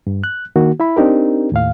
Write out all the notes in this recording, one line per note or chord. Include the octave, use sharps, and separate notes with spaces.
G2
F#6
D#3 A#3 F#4
E4 E5 B5
C4 D4 D#4 G4 A#4
D#2 A2 F5